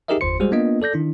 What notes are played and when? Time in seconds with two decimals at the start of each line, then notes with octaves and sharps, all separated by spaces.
0.08 D#4 G4 G#4 A#4 D#5 E5
0.21 G1 E2 C5 C6 C#7
0.40 G3 G#3 F#4 G#4 C5
0.52 A#3 B3 D4 F4 D#5
0.82 A4 D5 G6 A#6
0.94 D#3 D4 E4